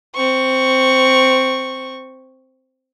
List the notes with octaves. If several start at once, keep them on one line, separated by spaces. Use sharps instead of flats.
C4 C#6